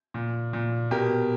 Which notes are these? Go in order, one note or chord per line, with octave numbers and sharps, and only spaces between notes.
A#2
A#2
B2 G4 A#4